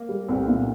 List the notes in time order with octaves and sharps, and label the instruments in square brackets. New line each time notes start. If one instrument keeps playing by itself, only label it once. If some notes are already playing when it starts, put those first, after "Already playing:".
Already playing: [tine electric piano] A#3
[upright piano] G3
[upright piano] C2 [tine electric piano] A3 C4
[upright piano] A#2